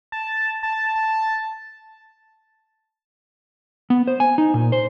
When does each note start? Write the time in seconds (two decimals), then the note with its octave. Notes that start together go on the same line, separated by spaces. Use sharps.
0.12 A5
0.63 A5
0.95 A5
3.90 B3
4.07 C5
4.20 G#5
4.38 D#4
4.54 A#2
4.72 C5